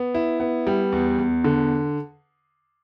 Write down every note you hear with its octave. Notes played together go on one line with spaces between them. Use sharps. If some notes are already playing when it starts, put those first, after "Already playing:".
Already playing: B3
E4
B3
G3
E2
E2
D3